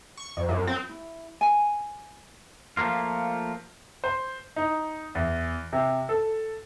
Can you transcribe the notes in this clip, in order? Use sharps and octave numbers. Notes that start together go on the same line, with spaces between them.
C#6
F2
F#2
C4
E4
G#5
F3 A3 A#3 F4
C5
D#4
E2
C3
A4